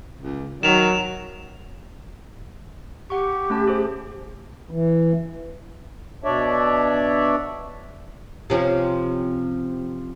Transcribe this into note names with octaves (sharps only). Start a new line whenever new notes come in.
C#2
D#3 F#3 E7 F7
G4 F#5 C#6
A3 C#4 A5
G#4 C5
E3
B2 D4 C#5 D5 E5
C3 F3 C#4